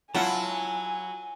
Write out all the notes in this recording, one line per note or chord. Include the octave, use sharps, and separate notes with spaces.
F#3 E4 F4 F#5 G#5 A5